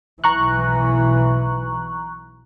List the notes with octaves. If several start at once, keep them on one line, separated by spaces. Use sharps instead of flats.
B1 E3 A#5 C#6 F#6